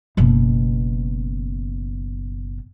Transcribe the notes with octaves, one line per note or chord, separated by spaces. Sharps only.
F#1 B2